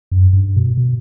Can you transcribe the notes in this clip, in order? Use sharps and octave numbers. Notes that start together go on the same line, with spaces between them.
F#2
G2
B2
B2